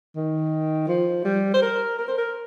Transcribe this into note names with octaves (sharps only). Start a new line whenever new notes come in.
D#3
F3
G3
C5
A#4
A#4
C5
A#4